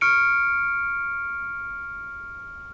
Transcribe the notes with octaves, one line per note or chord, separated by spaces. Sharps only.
C#6 F6 C#7 D7